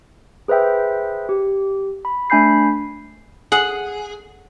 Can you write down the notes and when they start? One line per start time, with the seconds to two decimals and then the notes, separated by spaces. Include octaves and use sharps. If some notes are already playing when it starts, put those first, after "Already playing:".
0.48 G#4 B4 C5 E5 G5
1.29 G4
2.05 B5
2.30 A3 D4 G#5 B5 G6 C7
3.52 G#4 F#5